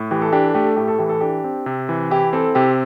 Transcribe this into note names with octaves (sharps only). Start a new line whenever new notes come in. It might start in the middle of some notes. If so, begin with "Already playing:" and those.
Already playing: A2
E3 G4
A4
D4 G4
A4
A3 G4
A4
A2 G4
A4
E3 G4
A4
D4 G4
C4
C3
E3
E4 G4
C4 A4
C3 G4